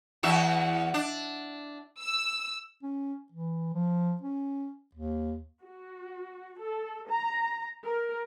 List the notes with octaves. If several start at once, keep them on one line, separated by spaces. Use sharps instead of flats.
E2 F#4 E5
D4
E6
C#4
E3
F3
C#4
D#2
F#4
A4
A#5
A#4